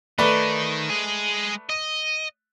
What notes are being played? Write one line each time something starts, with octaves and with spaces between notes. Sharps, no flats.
D#3 A3 D#4 B4 D5
G#3 G#4
D#5